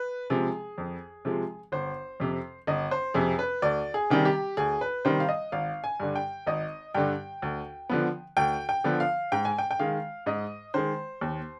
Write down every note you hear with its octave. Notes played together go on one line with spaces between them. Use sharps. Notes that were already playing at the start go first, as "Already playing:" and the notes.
Already playing: B4
C3 F3 G#3 G#4
F2
C3 F3 G#3
G1 C5
F2 C3
G1 D#5
C5
F2 C3 G#4
B4
D2 D5
G#4
C3 D#3 G3
G4
D2 G#4
B4
C3 D#3 G3 C5
F5
D#5
G#1 F5
G#5
G2 D3
G5
G#1 D#5
G2 D3 G5
D2
D3 F3 B3
D2 G5
G5
D3 F3 B3
F5
G#2 G5
G#5
G5
G5
D#3 G#3 F5
G#2 D#5
D#3 G#3 C5
D#2